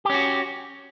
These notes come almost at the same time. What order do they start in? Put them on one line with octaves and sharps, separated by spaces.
G4 C#4 F#4